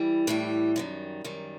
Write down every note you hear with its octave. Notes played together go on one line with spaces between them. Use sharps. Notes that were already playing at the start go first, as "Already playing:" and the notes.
Already playing: E3 G3
A2 E3 G3 G4
F#2 D#3 G3
F#2 D#3 G3